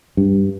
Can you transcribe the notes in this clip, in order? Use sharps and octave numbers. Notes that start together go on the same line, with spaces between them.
G2